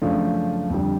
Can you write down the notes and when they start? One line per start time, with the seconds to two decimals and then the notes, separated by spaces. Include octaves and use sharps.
0.02 F#2 C#3 F3 A3 D4
0.70 F2 D3 G3